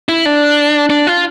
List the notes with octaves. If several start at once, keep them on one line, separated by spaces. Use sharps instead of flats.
E4
D4
D4
F4